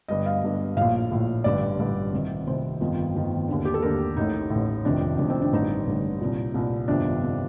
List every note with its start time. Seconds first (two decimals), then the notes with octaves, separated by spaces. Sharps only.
0.08 G1 G2 D3 D#5
0.26 F5
0.42 G1 G2 D3
0.76 A#1 A2 F5
1.11 A#1 A2
1.44 A1 G2 D3 D5
1.79 A1 G2 D3
2.12 C2 C3 D#3
2.47 C2 C3 D#3 C5
2.81 G1 F2 D#3
3.15 G1 F2 D#3
3.48 D#2 D3
3.65 G4
3.74 A4
3.82 D#2 D3 A#4
4.17 A1 A2 D#4
4.50 A2
4.55 A1
4.85 F1 F2 C3 D#3 D4
5.18 F1 F2 C3 D#3 D4
5.30 C4
5.42 D4
5.53 A1 G2 D3 D#4
5.87 A1 G2 D3
6.21 C2 A#2
6.54 C2 A#2
6.88 G1 F2 C3 D#3 D4
7.23 C3 D#3